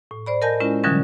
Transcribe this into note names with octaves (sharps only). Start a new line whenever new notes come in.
A2
C5 D5 B5
A#4 D#5 G#5 A5 G6 A#6
G#3 C#4 E4 F4
B2 D3 E3 F#3 G3 C#4